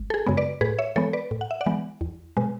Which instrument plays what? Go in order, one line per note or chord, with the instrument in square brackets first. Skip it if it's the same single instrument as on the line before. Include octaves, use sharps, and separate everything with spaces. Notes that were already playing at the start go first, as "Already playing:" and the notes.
Already playing: [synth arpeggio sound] G#1
A4
G#4
F#2 C#3 G#3 B3
B4 D5
A2 G#4 B4
C#5 E5
E3 G#3 B3 A4 C#5
B4 D5
A2
F#5
E5
D5 F#5
E3 G#3 B3
E2
B2 G#3